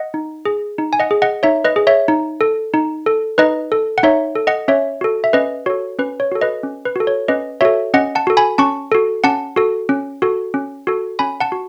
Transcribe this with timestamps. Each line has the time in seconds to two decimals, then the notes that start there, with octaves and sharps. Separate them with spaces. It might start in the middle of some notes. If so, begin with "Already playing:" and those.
Already playing: D#5 F#5
0.14 D#4
0.45 G#4
0.78 D#4
0.93 G#5
1.00 D#5 F#5
1.11 G#4
1.22 D#5 F#5
1.43 D#4 C#5 E5
1.64 B4 D#5
1.76 G#4
1.87 C#5 E5
2.08 D#4
2.41 A4
2.74 D#4
3.06 A4
3.38 D#4 B4 D#5
3.72 A4
3.98 F#5
4.03 D#4 C#5 E5
4.35 A4
4.47 D#5 F#5
4.68 C#4 C#5 E5
5.01 F#4 A4
5.24 E5
5.33 C#4 B4 D#5
5.66 F#4 A4 C#5
5.99 C#4 B4
6.20 C#5
6.32 F#4 A4
6.41 B4 D#5
6.63 C#4
6.85 B4
6.96 F#4 A4
7.07 C#5
7.28 C#4 B4 D#5
7.61 F#4 A4 C#5 E5
7.94 C#4 D#5 F#5
8.15 F#5 A5
8.27 F#4 A4
8.37 G#5 B5
8.58 C#4 A5 C#6
8.92 F#4 A4
9.24 C#4 F#5 A5
9.56 F#4 A4
9.89 C#4
10.22 F#4 A4
10.54 C#4
10.87 F#4 A4
11.19 C#4 G#5 B5
11.40 F#5 A5
11.52 F#4